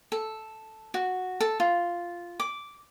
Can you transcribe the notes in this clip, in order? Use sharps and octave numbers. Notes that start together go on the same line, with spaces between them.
A4
F#4
A4
F4
D6